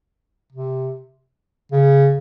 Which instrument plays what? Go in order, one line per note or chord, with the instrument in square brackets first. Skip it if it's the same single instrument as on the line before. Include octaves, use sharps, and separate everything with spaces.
[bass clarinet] C3
C#3